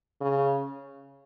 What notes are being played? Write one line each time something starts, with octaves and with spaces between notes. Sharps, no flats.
C#3